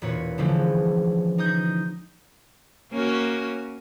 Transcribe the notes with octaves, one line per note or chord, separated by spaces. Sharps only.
E1 A#2 B4 C#5
D3 E3 F3 G#3 A3 C#4
D#4 D#6 G6
A#3 C#4 F#4